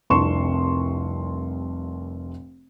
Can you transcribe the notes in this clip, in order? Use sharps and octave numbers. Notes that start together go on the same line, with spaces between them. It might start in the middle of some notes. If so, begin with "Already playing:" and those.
F1 C2 D4 C6 C#6 E7